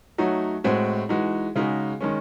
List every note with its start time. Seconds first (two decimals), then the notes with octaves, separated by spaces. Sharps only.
0.18 F#3 A3 D#4 F#4
0.64 A2 G#3 C4 F#4
1.09 E3 G#3 D#4 F#4
1.56 C#3 G#3 D#4 F#4
2.01 D#3 G#3 C#4